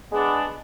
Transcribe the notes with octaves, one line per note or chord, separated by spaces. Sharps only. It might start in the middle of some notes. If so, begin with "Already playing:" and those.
G#3 B3 D4